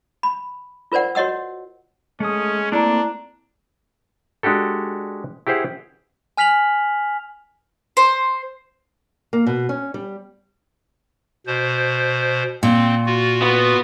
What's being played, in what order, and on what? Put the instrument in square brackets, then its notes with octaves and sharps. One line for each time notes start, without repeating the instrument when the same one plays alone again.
[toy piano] B5
F4 A#4 C5 D5 F#5
F#4 C#5 D#5 F#5 E6
[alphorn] G#3 [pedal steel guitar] A3 D#6 [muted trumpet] C#4
[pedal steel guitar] A3 A#3 C4 [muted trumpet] D4 [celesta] E4 D5 A#5
[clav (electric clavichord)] G#3 D4 F#4 G4 A4
E4 G4 G#4 C5 F#5
[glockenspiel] G#5 F6 B6 F7 F#7
[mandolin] C5
[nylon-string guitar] A#3
B2
C#4
G3
[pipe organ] B2 C5
[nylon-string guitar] A#2 [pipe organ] C4
[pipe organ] F4 F#4
[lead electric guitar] B3